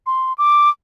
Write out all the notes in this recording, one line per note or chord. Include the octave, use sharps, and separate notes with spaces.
C6
D6